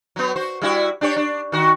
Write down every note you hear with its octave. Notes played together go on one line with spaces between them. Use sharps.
F#3 B3
F#4 C5
G3 E4 F#4
D4 G4 C#5
D4
D#3 F#4